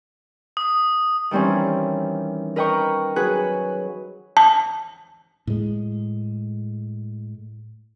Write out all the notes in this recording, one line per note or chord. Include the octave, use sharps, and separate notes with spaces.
D#6
D#3 E3 G3 C4 C#4
A#4 B4 D#5 G5 A#5 C#6
F#3 F#4 G#4 B4 F#6
A5
A2 G#3